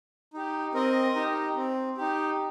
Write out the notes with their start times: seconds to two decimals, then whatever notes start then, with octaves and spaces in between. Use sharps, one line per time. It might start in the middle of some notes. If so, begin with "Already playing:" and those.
0.34 D#4 G4
0.74 C4 A#4 D#5
1.15 D#4 G4
1.56 C4
1.97 D#4 G4